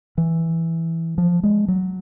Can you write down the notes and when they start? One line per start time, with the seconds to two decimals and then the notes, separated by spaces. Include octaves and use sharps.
0.18 E3
1.18 F3
1.43 G#3
1.68 F#3